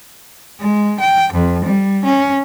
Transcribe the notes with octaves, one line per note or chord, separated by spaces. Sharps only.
G#3
G5
F2
G3
C#4